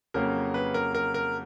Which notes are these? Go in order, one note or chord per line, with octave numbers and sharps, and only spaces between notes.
F2 C#3 F#3 A#3 A#4
B4
A#4
A#4
A#4